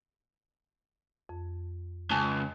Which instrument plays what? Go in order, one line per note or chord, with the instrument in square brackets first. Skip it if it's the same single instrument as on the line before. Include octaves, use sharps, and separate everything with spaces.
[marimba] F2
[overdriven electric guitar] C#2 [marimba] G#5 A5